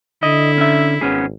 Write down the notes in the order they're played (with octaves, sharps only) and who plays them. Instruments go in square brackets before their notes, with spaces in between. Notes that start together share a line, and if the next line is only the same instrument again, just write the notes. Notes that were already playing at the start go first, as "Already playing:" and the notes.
[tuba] D3 [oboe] E4 [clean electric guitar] D#5
[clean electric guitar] C#4 E5
[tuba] G#1 [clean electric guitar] B3 C#4 G#4